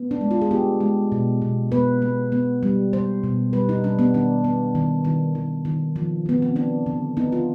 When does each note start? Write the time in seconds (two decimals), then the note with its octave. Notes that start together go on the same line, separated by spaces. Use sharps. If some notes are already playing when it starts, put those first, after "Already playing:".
Already playing: B3
0.11 D4
0.21 G#3
0.31 F4
0.41 G#4
0.51 B3 G4
0.80 G#3
1.12 B2
1.42 B2
1.72 B3 B4
2.02 B3
2.32 B3
2.63 G3
2.93 G3 C5
3.24 B2
3.53 G3 B4
3.69 D#4
3.84 G3 D4
3.99 B3
4.14 D#3 D4
4.44 B3
4.75 D#3
5.05 D#3
5.35 D#3
5.65 D#3
5.96 F3
6.26 F3 B3
6.42 C4
6.56 B3 D4
6.86 D3
7.17 B3 D#4
7.32 F4